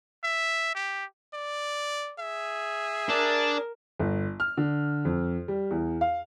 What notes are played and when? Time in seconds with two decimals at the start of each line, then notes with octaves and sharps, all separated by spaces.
0.24 E5
0.75 G4
1.34 D5
2.19 G#4 E5
3.09 D4 A#4
3.99 G1
4.40 F6
4.57 D3
5.05 F2
5.48 G3
5.71 E2
6.01 F5